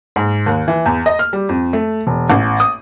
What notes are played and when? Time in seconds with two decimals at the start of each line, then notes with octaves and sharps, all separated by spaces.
0.16 G#2
0.46 D#2
0.68 E3
0.86 E2
1.06 D#5
1.19 F6
1.33 G3
1.49 F2
1.73 A3
2.07 E1
2.30 A1
2.60 D#6